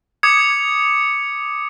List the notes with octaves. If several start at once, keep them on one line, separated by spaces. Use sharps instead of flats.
D6 D#6 G#6 C#7